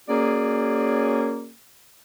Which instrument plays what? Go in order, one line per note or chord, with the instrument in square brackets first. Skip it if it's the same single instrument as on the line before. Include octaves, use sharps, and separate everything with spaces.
[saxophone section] A#3 C#4 F#4 G#4 D5